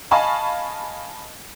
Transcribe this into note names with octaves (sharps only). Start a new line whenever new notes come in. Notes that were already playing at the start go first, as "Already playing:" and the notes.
D#5 F5 G#5 A5 B5 C#6